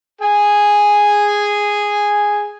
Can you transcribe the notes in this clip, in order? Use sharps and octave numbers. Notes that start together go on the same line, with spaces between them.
G#4 G#5